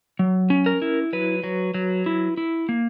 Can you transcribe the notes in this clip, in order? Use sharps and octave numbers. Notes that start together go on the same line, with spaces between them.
F#3
C#4
A#4
E4
F#3 B4
F#3
F#3
E4
E4
A#3